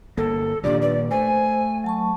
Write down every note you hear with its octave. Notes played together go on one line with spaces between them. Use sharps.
G1 A#3 A4
A#2 D#3 F3 D4 G4 D5
B4 D5
A3 C5 G#5
F#3 A5 C#6